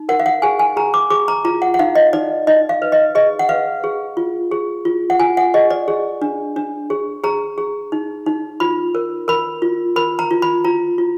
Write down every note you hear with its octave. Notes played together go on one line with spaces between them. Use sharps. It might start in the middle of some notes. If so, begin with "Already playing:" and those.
Already playing: D#4
A#4 F#5
F5
F#5
G#4 G#5
G#5
G#4 A#5
D6
G#4 D6
A#5
F4 A#5
F#5
F#5
D#4 F5
D#5
D#4 D5
D#4 D#5
F5
B4
D#5
G#4 D#5
F#5
B4 F5
G#4
F4
G#4
F4
F#5
F4 G#5
F#5
G#4 D#5
D5
G#4
D4
D4
G#4
G#4 A#5
G#4
D#4
D#4
F4 B5
A#4
A#4 B5
F4
A#4 B5
A#5
F4
B5
F4 A#5
F4